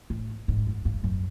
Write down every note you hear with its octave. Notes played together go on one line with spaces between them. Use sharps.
A2
G#2
F#2
G2
F#2